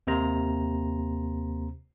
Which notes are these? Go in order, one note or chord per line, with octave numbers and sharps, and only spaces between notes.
D#2 C3 A#3 C5 A#5